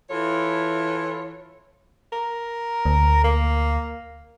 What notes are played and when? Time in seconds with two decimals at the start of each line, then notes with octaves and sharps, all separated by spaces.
0.10 E3 E4 F4 A4 C#5
2.12 A#4
2.85 D2
3.24 A#3